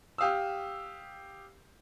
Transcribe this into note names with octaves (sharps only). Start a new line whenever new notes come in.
G4 F5 D#6 E6